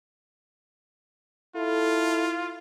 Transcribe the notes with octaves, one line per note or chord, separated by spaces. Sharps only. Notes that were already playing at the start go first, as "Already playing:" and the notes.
E4 F4 A4